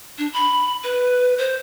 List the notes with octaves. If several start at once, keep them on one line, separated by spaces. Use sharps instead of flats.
D4
B5
B4
C5